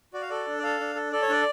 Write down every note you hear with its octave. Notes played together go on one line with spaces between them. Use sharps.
F#4 D5
F5
A4 D5
D4
D5
A4 F5
D4
A4
A4 D5
C#5
D4 D5